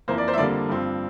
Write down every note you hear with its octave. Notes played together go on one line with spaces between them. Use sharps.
F2 E3 A#3 C5
D5
C5
E5
F2 D3 G3 A#3 D5
G2 F3 C4